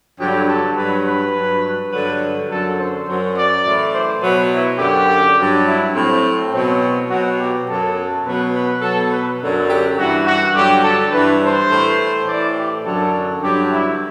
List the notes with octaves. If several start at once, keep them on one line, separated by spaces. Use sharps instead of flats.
G2 D3 F#3 G4
A4
G2 B4
F#3
B4
G2 F#3
G2 D3 F#3 B4
F#2 D3 F#3 A4
C5
F#2 F#3
D5
A2 E3
C5
B2 F#3 B4
E4
F#2 D3 F#3 G4
G2 F#3
E4
A2 F#3 C4
B2 F#3 C4
B2 F#3 F#4
G4
F#2 F#3 A4
B2 F#3 B4
B4
B2 F#3 A4
B4
F#2 D3 F#3
G4
G2 E3 F#4
F#4
G2 D3 F#3 G4
A4
G2 E3 B4
C5
A2 E3
A2 E3 D5
G4
F#2 D3 F#3 A4
G2 D3 F#3 G4
E4